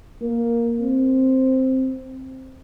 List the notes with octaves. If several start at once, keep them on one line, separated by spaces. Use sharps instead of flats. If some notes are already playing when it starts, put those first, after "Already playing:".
A#3
C4